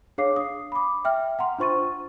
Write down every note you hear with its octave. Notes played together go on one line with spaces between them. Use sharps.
D4 G#4 C#5 F5 D6 C7
D#6
B5 D6
E5 G5 F6
F#5 A#5 C6
D4 F4 C5 C#6 A6 D#7